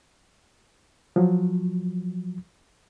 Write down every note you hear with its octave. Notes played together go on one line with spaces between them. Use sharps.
F3 F#3